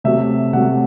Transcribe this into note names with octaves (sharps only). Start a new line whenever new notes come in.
C3 F#3 A3 E5
C3 F#3 A3 F#5